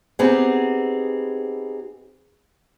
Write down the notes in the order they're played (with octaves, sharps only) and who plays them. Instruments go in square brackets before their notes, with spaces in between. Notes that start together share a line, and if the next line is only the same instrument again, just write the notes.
[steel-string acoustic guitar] B3 C4 D#4 G4 G#4